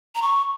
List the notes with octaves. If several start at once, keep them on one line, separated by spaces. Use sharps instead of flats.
A#5
C#6